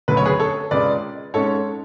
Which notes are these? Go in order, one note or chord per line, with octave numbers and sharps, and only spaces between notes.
D2 C#3 F#3 B4
C#5
G#4 B4
A4 C#5
C#2 C#3 G#3 B4 D5
G#2 G#3 C#4 A4 C#5